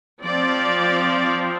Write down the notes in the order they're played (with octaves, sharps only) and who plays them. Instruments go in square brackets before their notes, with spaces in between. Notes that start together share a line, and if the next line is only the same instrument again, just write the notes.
[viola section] F3 C4 D5